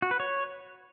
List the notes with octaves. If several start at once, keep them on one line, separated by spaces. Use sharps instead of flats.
F#4
B4
C#5